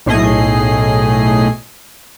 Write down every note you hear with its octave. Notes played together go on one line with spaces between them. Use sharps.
B1 A2 A3 G#4 D#5 C7